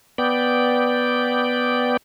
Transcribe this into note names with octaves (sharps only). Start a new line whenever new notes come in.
B3 D5 G5